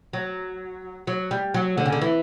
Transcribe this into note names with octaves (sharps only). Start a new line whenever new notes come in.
F#3
F#3
G3
F#3
D3
C#3
D3
E3